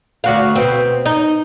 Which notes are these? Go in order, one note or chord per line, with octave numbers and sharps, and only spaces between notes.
D2 F#4 F5
B2 C4
D#4